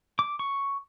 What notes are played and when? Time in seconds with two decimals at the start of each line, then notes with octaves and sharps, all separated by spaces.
0.19 D6
0.39 C#6